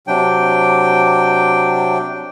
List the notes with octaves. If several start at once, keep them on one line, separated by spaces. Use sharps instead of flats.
C3 F#3 D4 G5